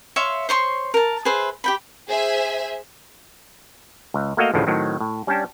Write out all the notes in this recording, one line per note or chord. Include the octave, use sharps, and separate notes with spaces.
C#5 E5 F5 C6
C5 C#5 C6 C#6
A#4 A5
G#4 B4 C5 E5
G4 G5 B5
G#4 C5 E5 G#5
C#2
A3 A#3 F#4 D#5 F5
A1 D2 A2 C#3 F3
A2 D#3 F#3 C4
A2
G3 C#4 D4 G5 A5